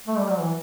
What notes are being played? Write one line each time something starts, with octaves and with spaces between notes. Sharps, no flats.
A3
G3
F#3
E3